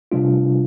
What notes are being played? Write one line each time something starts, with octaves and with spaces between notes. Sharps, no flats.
C3 G3 D4 F4